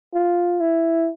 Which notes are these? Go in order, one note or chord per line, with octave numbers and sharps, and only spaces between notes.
F4
E4